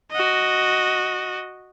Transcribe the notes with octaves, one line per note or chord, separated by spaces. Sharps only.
F#4 D#5